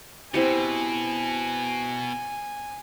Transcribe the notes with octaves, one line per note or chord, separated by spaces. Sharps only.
B2 C4 E4 G4 G#5